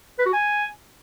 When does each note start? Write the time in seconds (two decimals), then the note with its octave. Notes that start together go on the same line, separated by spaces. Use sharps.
0.19 B4
0.26 F#4
0.33 G#5